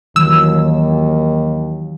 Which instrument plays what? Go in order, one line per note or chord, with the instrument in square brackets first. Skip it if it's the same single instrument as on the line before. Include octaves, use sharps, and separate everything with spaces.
[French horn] D#2 [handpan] D#3 E3 F#3 [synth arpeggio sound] E6